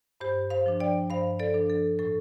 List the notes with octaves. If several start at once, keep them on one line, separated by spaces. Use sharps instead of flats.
G2 G4 C5
C5 F5
F3 D4
D5 G5
G2 C5 F5
A4 D5
F3 D4
A4
A2 A4